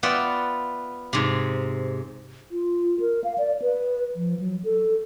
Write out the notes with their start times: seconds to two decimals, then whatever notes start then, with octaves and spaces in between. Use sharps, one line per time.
0.03 B3 F4 D5 E5 F#5 G5
1.13 G#2 C3
2.51 F4
3.00 A#4
3.24 F5
3.38 D5
3.62 B4
4.16 F3
4.40 F#3
4.64 A4